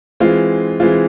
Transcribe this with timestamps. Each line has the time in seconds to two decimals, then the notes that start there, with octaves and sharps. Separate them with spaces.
0.20 E3 G#3 C4 F4
0.80 E3 G#3 C4 F4